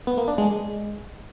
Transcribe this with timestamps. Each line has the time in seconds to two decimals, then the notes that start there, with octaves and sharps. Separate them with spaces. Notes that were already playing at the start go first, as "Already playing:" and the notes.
0.07 B3
0.17 A#3
0.28 D4
0.38 G#3
0.48 G#3